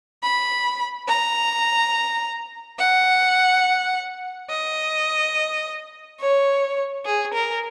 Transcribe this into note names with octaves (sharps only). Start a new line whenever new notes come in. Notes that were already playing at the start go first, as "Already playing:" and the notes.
B5
A#5
F#5
D#5
C#5
G#4
A#4